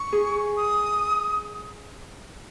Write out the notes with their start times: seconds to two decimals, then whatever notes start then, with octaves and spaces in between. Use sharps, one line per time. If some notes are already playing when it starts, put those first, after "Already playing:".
Already playing: C#6
0.13 G#4
0.57 D#6